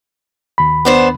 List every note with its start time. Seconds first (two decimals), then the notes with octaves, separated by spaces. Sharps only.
0.58 D#2 B5
0.85 B3 D4 C5